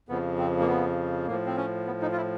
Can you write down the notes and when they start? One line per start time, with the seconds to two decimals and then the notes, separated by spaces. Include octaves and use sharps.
0.09 F2 C#3 F3 B3
0.38 C4
0.61 A#3
0.68 B3
1.27 A2 F3 A#3
1.46 C4
1.57 C#4
1.87 B3
2.02 D#4
2.12 F4
2.16 E4